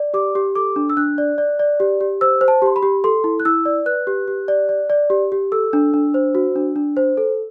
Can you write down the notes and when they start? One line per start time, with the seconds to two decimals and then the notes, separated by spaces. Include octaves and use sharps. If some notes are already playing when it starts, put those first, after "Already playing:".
Already playing: D5
0.14 G4 D6
0.35 G4
0.55 A4 D6
0.76 D4
0.90 E6
0.97 D4 F#6
1.18 D5
1.38 D5
1.59 D5
1.80 G4
2.01 G4
2.21 C5 E6
2.41 C5
2.48 A5
2.62 G4 C6
2.76 B5
2.83 G4
3.04 A4 C6
3.24 E4
3.40 F#6
3.45 E4 E6
3.65 D5
3.86 B4 F#6
4.07 G4
4.28 G4
4.48 D5
4.69 D5
4.90 D5
5.10 G4
5.32 G4
5.52 A4 E6
5.73 D4
5.94 D4
6.14 C5
6.35 F#4
6.56 D4
6.76 D4
6.97 C5
7.17 A4